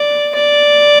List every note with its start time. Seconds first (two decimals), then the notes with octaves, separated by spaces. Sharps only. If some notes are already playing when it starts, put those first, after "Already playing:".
Already playing: D5
0.35 D5